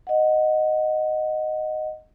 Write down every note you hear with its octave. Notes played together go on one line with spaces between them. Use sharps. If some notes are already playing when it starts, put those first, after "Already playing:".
D#5 F#5